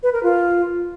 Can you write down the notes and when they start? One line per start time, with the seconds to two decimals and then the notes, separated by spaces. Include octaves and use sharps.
0.03 B4
0.13 A#4
0.23 F4